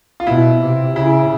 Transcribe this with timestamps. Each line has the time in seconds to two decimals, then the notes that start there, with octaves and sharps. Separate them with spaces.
0.20 F4
0.27 B2 E4
0.61 C3
0.96 C#3 E4